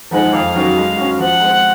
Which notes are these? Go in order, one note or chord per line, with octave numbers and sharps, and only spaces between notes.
F3 G#3 D#4 G#4 F#5
F2 F5
D#3 F#3 C#4 F#4
G#3
C#4 F#4
F3 F#5
G#3 C4